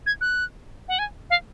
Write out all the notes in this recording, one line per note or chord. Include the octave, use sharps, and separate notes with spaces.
G#6
F#6
F#5
G#5
F5